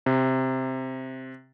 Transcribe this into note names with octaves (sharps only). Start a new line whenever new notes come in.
C3